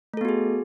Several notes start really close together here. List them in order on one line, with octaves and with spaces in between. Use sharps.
A3 A4 B3 F#4 G#4